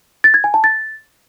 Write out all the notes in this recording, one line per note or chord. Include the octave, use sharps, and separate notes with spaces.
A6
G#6
G#5
A5
A6